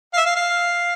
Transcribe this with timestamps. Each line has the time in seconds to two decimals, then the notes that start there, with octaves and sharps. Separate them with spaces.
0.13 F5
0.17 E5
0.26 F5
0.36 F5